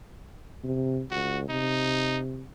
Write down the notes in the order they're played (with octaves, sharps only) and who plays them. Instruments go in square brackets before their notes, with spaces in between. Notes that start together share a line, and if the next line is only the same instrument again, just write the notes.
[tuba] C3
[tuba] C#2 [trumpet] F#4
[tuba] C3 [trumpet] D#4